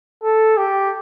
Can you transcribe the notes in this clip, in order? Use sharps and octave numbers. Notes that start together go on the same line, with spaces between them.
A4
G4